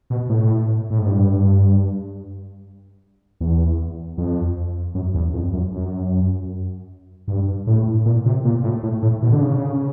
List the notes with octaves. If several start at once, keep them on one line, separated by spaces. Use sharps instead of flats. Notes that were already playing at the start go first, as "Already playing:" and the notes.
B2
A2
A2
G#2
G2
E2
F2
F#2
E2
F2
F#2
F#2
G2
A2
A#2
C3
A#2
A2
A2
A2
B2
D3
C#3